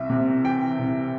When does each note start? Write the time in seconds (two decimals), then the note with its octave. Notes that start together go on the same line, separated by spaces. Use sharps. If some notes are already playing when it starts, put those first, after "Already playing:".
Already playing: C2 E5
0.10 C3
0.44 E3 G5
0.79 C2